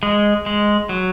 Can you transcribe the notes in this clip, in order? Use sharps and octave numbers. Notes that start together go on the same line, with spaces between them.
G#3
G#3
F#3